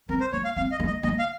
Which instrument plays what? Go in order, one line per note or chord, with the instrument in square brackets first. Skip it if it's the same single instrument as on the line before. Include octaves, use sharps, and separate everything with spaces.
[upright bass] C4 [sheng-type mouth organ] A#4
[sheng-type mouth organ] C5
[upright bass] A#3 [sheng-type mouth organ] C#5
[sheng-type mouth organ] F5
[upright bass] C4 [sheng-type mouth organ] F5
[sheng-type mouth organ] D#5
[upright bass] A#3
[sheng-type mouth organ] D#5
[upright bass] A#3 [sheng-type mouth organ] D#5
[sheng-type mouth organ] F5